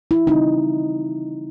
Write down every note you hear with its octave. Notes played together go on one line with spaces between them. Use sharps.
E4
C#3 E3 G3 C4 D#4